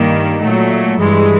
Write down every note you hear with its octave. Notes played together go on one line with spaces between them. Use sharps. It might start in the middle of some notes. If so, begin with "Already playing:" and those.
Already playing: G2 D#3 G3 A#3
A#2 F#3 A3
G2 E3 G#3